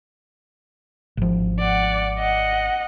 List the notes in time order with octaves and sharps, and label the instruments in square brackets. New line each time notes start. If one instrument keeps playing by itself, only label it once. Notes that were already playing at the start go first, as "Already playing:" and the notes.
[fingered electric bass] G#1 F3
[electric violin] D5 F#5
D#5 F#5